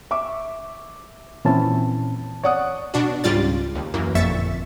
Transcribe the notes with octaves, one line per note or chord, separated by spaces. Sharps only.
E5 C#6 D6
A#2 E3 C4 C#4 E4 A5
C#5 D5 F#5 D#6
B2 D4 F#4
C#2 G#2 G3 F4 D5 A6
D#2
F#2 E3 A#3
G1 F2 A#2 E5 C#6 A6